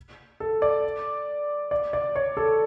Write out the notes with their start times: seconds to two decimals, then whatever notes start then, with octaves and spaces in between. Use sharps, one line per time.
0.40 A4
0.62 D5
1.71 D5
1.93 D5
2.16 C#5
2.37 A4